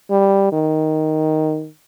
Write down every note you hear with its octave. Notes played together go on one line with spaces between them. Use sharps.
G3
D#3